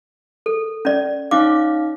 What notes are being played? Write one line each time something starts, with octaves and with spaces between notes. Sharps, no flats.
A4
C#4 D5
C#4 D#4 F5 D6